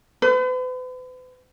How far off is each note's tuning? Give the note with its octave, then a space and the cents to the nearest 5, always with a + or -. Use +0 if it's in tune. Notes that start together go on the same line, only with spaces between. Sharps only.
B4 +45